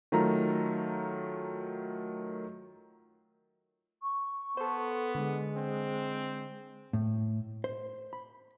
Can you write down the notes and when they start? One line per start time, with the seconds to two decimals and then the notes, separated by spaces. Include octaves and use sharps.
0.12 D#3 F#3 A3 F4 A#5
4.02 C#6
4.57 B3 A4 C5
5.15 D3 G#3
5.57 C4
6.93 A2
7.64 C5
8.13 B5